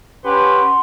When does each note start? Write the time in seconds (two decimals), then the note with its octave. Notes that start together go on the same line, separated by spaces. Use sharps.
0.24 C#4 G4 B4 F#5 C6